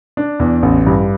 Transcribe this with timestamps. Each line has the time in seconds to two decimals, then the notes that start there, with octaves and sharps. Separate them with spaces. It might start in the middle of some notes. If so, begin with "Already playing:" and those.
0.17 D4
0.40 E2
0.62 A1
0.87 G2